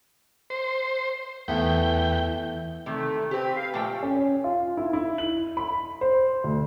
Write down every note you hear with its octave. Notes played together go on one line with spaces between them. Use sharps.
C5
E2 E3 A3 B3 G5
C3 D#3 A3
C4 G4 B4
F5
A#2 F3 A3 G5
C#4
F4
E4
E4
F#7
B5
C5
D2